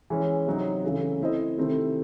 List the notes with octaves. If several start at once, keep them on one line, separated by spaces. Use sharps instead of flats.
E3 G#3 C#4
C3 F#3 C4 D#4
C#3 E3 A3
A3 C4 E4 C5 D#5
C3 D#3 A3 C4 E4